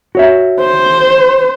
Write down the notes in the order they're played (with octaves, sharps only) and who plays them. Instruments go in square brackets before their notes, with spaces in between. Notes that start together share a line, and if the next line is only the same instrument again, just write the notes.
[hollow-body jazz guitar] F#4 C#5 E5
[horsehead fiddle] C5